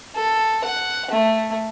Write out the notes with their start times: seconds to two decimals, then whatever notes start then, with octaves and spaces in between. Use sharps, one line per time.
0.15 A4
0.65 F#5
1.11 A3